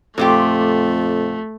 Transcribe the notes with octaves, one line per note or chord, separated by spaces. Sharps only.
F2 A#2 A3 F4 G4